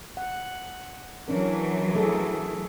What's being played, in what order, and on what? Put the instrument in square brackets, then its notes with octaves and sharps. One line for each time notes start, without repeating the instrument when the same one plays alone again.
[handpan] F#5
[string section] E3 F#3 [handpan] C#4 D4 A#4
[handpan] A3 G#4 A4